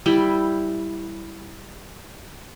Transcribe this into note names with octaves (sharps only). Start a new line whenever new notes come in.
G3 E4 G5